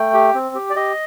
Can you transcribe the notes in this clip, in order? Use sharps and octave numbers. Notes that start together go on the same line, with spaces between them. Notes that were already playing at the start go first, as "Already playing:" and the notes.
Already playing: A3 G5
G4
C4
G4
D5
G4 D#5